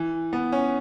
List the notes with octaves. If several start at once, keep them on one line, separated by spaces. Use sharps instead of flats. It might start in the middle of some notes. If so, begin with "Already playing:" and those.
Already playing: E3
B3
C#4